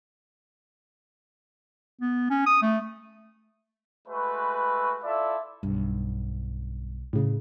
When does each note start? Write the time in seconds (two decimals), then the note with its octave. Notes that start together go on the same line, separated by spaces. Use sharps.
2.01 B3
2.30 C#4
2.46 D#6
2.62 A3
4.08 G#3 A3 F#4 B4
5.04 E4 F4 A4 D5 E5
5.63 B1 G2
7.13 A2 C#3